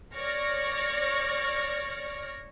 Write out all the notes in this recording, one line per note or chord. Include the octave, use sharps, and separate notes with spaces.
C#5 D5 C#6 F6 A#6